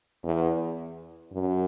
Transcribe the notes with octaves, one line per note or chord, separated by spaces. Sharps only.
E2
F#2